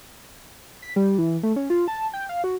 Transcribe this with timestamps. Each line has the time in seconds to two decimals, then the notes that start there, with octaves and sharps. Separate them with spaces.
0.82 B6
0.96 G3
1.18 E3
1.43 A3
1.56 C#4
1.70 F4
1.88 A5
2.13 G5
2.29 F5
2.44 F#4